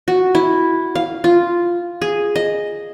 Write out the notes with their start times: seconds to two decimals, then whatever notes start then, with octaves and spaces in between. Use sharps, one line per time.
0.08 F#4
0.35 E4
0.95 F5
1.24 F4
2.02 G#4
2.36 D#5